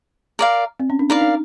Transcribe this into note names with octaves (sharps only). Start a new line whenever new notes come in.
A#4 D5 F5
C4
C#4
D4
D#4 A#4 D5 F5
D#4